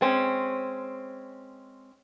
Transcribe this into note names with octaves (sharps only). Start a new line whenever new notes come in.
G#3 C4 C#4